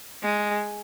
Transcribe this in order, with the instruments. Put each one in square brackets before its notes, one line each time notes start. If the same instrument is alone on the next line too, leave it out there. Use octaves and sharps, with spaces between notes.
[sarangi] G#3